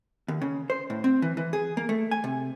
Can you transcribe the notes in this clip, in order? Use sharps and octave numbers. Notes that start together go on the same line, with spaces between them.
D#2
C#3
C5
A2
C4
E3
E3
G#4
A#3
A3
G#5
C3